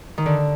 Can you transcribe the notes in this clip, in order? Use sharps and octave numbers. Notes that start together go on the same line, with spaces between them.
D#3
D3